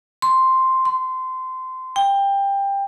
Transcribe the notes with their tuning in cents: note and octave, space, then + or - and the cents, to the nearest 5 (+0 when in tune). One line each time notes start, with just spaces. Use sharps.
C6 +0
C6 -20
G5 +20